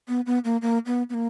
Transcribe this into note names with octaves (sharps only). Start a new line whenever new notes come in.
B3
B3
A#3
A#3
B3
B3
A#3